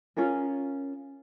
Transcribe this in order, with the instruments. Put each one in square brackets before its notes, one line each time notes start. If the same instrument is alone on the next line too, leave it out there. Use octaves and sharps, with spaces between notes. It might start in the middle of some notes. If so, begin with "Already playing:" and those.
[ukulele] C#4 F4 G#4 A#4